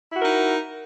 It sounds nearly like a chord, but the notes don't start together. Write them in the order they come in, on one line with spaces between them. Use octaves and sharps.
E4 F#4 A#4 D#4